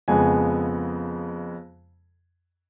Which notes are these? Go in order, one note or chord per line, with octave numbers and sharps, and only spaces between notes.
F2 C#3 F3 G#3 B3 G#5